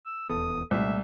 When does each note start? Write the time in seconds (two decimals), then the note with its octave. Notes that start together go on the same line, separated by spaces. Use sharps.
0.06 E6
0.29 D#1 E2 B3 A4 D#6
0.71 C2 A#2 G#3 A3 E5